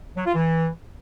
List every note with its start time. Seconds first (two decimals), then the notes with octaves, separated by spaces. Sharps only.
0.16 F#3
0.26 F4
0.35 E3